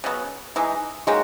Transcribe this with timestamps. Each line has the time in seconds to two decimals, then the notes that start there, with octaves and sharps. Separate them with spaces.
0.04 C#3 F#3 B3
0.56 E3 G#3 D#4
1.07 D#3 G#3 A#3 C#4 F#4